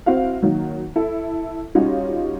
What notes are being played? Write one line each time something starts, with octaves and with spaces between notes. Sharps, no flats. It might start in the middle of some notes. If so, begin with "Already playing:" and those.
C4 E4 F#4 F5
D#3 F#3 A#3
E4 A4
G3 C#4 D#4 F4 F#4 C#5